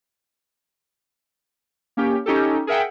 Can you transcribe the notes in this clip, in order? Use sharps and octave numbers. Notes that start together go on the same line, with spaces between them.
A#3 C#4 G4
C#4 D#4 G4 A4
G#4 A#4 E5 F#5 G5